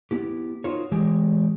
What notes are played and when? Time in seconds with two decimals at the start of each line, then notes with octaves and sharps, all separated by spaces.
0.11 B3 E4 G4
0.64 D#4 F4 F#4 A#4 C5 C#5
0.91 A2 E3 G#3 G4 G#5